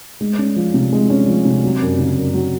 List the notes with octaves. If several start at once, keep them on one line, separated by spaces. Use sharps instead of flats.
G#3
C#4
F3
C3
G#3
C#4
F3
C3
F#3
F#2
C#3
F#2
F#3